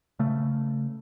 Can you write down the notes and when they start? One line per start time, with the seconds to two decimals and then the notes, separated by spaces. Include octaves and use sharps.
0.19 C#3 A3